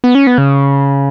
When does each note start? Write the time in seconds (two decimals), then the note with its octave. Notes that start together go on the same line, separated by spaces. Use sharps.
0.04 B3
0.15 C#4
0.27 B3
0.38 C#3